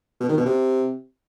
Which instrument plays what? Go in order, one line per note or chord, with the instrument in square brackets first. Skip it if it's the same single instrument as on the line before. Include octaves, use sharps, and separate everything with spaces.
[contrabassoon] B2
D#3
B2
C3